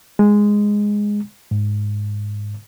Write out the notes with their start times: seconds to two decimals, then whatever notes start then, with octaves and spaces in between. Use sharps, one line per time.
0.19 G#3
1.51 G#2